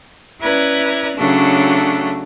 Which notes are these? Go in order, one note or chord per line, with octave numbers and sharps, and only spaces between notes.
C#4 E4 B4 D5 A#5 G#6
C#3 F#3 A3 D4